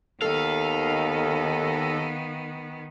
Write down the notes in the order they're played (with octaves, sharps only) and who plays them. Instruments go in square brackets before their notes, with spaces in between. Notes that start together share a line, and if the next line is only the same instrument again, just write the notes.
[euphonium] D#2 [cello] D#3 B3 [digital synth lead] A4 [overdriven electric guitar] F5